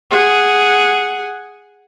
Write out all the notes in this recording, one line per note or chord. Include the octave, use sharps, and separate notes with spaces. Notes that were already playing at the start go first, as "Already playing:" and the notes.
G#4 F#5